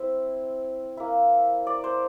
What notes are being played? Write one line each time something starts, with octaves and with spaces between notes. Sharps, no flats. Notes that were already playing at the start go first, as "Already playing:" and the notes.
Already playing: C4 E4
A#3 E4
D5
C5